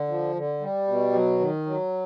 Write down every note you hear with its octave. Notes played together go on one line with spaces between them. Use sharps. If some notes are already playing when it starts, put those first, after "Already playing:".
Already playing: D3
F3
D3
G3
B2
F#3
D#3
F#3